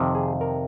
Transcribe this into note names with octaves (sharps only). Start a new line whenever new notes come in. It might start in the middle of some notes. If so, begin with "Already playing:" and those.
Already playing: F2 C3 D#3
G#4
A#4